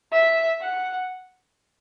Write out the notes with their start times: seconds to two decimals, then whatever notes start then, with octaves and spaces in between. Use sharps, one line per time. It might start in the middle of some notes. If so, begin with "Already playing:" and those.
0.12 E5
0.61 F#5